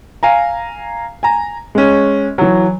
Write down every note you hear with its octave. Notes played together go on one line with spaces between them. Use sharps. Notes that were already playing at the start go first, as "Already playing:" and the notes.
F5 G#5 A#5
G#5 A#5
G#3 C#4
E3 F#3